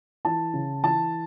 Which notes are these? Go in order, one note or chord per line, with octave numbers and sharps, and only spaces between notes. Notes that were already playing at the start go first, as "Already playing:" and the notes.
E3 A5
C#3
E3 A5